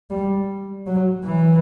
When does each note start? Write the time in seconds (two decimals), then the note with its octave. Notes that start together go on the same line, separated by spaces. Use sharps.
0.10 G3
0.86 F#3
1.24 E3